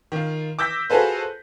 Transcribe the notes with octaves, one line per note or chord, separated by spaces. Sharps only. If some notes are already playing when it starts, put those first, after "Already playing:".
D#3 F4
D6 E6 G6 A#6 B6
F4 F#4 G#4 A4 B4 C5